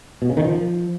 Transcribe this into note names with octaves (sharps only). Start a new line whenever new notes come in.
B2
C#3
D#3
F3